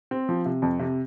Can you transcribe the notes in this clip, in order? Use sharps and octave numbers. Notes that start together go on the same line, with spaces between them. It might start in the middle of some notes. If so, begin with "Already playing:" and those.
C4
F3
C3
F2
C3